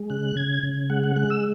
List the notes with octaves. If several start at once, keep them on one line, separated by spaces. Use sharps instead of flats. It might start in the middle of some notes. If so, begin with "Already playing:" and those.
Already playing: G#3
C#3 F#6
C#3 G#6
C#3
G#3 F#5
F#5
G#3 F#6
E6